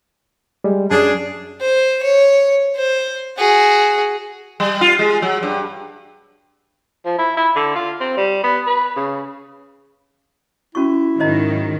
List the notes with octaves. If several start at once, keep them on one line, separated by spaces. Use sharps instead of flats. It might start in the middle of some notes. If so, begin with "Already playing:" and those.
G3 G#3
F#2 D4 G#4
C5
C#5
C5
F#4 G#4
G3
F4
G#3
F#3
G2
F3
E4
E4
D3
F4
C4
G3
B3
B4
C#3
C#4 E4 F#4 C#6
G#2 D#3 F#3 C5 D#5 A#5